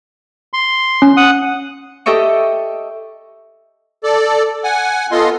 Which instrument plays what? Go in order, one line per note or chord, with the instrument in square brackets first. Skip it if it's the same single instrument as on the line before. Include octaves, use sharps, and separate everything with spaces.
[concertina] C6
[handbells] C#4
[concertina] F#5 D#6
[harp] G4 A4 D#5 E5 C#6
[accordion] A4 D5
F#5 G#5
B3 F4 A4 D#5 C6